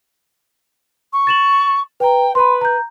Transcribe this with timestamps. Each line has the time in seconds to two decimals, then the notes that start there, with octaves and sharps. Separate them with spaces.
1.13 C#6
1.27 A6 E7 F#7
2.00 B4 G5 A#5
2.35 B4 B5 C6
2.61 A#5 G6